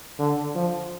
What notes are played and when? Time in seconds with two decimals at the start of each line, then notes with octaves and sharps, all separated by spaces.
0.19 D3
0.55 F3